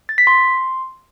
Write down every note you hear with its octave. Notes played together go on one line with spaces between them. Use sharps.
A6
B6
C6